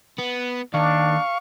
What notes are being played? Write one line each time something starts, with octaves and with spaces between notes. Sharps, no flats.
B3
D#2 D4 F5 C#6